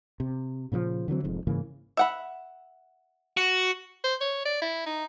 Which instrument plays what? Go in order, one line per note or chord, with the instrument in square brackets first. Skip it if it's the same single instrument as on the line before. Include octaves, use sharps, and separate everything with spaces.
[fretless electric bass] C3
A#2 C#3 E3 F3
D3 E3 F#3 C4
F1 F2 G#2
G#2 C#3 E3 A#3
[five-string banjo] E5 F#5 B5
[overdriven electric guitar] F#4
[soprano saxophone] C5
C#5
D5
E4
D#4